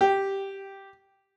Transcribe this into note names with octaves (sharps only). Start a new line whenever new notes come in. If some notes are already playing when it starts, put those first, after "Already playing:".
G4